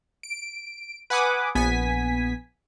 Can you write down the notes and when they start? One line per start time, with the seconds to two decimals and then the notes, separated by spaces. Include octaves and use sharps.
0.23 D7
1.10 B4 F#5 G#5 B5 D6 D#6
1.55 A#1 B3 G#5 B6